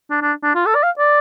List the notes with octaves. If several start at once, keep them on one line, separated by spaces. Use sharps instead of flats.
D4
D4
D4
F4
A4
D5
F5
D5